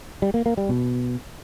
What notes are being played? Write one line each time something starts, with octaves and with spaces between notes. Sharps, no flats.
G3
A#3
A#3
G3
B2